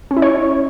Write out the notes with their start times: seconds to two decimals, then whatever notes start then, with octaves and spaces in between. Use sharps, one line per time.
0.11 C#4
0.17 E4
0.22 C#5